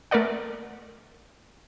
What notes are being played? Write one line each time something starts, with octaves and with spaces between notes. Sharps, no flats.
A3 A#4 B4 D5 F#5